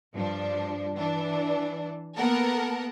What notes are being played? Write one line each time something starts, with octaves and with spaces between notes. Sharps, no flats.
G2 F3 D4
E3 D4
A#3 B3 A4 A#4 F#5